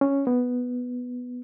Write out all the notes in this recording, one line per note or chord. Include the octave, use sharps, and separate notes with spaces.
C#4
B3